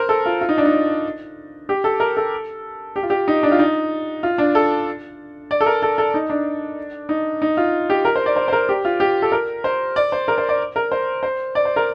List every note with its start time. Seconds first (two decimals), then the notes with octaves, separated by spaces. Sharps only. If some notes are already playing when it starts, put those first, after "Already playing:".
Already playing: A#4 C5
0.09 A4
0.26 F4
0.41 F4
0.49 D#4
0.58 D4
0.65 D#4
1.69 G4
1.84 A4
2.00 A#4
2.17 A4
2.96 G4
3.03 F4
3.10 G4
3.28 D#4
3.43 D4
3.52 F4
3.59 D#4
4.23 F4
4.38 D4
4.55 A4
5.51 D5
5.61 A4
5.66 A#4
5.82 A4
5.98 A4
6.14 D#4
6.30 D4
7.09 D#4
7.42 D#4
7.57 F4
7.90 G4
8.05 A#4
8.16 C5
8.26 D5
8.36 C5
8.48 C5
8.53 A#4
8.69 G4
8.85 F4
9.00 G4
9.22 A4
9.32 A#4
9.64 C5
9.96 D5
10.12 C5
10.28 A#4
10.38 C5
10.49 D5
10.76 A#4
10.92 C5
11.23 C5
11.55 D5
11.65 C5
11.76 A#4